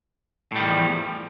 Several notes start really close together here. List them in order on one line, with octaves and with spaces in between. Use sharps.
A2 G3 D#3 E2 F3